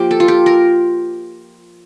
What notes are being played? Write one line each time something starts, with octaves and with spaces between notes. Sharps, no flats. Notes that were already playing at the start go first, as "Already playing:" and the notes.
Already playing: F3 A#3 G4
A4
F4
G4
A#4